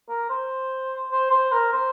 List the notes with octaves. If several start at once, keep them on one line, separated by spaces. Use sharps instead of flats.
A#4
C5
C5
C5
A#4
C5